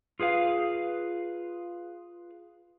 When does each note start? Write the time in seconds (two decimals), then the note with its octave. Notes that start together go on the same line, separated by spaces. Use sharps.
0.20 F4 G#4 B4 F5